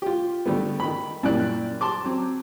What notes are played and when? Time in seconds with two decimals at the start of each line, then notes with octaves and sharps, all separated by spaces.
0.02 F4 G4
0.46 D3 G3 A3 B3
0.80 D#3 B5
1.23 F#2 A#2 G3 E4 D5 F#6
1.81 A5 C6 D6
2.04 F#3 C4